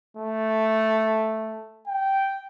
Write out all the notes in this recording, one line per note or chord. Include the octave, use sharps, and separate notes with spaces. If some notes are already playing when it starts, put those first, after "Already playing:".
A3
G5